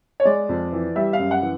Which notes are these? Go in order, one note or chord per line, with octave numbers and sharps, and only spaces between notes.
C#5
G#3 D5
F2
E3
G3 E5
F5
F#2
F#5
E3